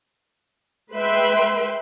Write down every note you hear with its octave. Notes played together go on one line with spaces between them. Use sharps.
G#3 B4 E5 G5 C6